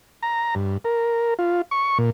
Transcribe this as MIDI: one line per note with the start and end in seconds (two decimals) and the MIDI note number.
0.23 0.55 82
0.55 0.77 43
0.85 1.34 70
1.39 1.61 65
1.71 1.98 85
1.98 2.10 46